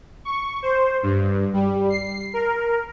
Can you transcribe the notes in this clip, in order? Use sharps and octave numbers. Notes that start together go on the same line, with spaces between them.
C#6
C5
G2
G3
C7
A#4